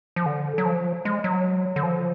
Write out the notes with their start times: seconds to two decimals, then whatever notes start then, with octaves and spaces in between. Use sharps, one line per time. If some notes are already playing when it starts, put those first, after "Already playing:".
0.16 F3
0.26 D3
0.58 F#3
0.65 F3
1.05 G#3
1.24 F#3
1.76 D3
1.83 F3